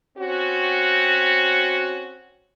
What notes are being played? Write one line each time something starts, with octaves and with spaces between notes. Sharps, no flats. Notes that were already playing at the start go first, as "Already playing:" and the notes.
C4 C#4 F#4